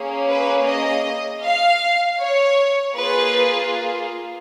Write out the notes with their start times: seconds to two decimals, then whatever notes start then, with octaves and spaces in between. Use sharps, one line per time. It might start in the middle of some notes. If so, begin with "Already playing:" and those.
Already playing: A#3 C#4 G#4
0.27 B4
0.65 D#5
1.42 F5
2.19 C#5
2.95 A#3 F4 G#4 B4